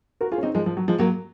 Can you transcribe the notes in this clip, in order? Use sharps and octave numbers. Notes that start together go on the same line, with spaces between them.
F#4 A#4
F4 G#4
C#4
C4 D#4
F3 G#3
F3
F#3
F3 G#3
F#3 A#3